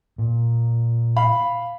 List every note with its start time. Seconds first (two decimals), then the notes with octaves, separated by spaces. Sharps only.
0.18 A#2
1.16 F5 B5